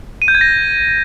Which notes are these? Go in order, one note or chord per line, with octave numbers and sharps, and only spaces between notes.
D#7
G6
G#6
A#6